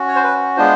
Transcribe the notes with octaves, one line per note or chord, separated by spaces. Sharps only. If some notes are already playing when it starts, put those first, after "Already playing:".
Already playing: C#4 F#4
C#5
C5
B4
G#3 B3 D4 F4 C5